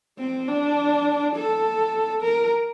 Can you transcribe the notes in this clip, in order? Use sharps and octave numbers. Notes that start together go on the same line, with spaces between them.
C4
D4
A4
A#4